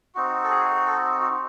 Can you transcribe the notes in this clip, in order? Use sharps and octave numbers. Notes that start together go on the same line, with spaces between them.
C4 D#4 F#4
A4
G#4
A4
F#4